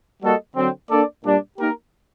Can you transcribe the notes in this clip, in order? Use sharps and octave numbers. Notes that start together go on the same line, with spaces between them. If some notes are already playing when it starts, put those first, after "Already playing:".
G3 A#3 F#4 A4 D#5
D3 F#3 C4
A#3 D4 A4 D5
A#2 G3 D4
A#3 D#4 G4 A#4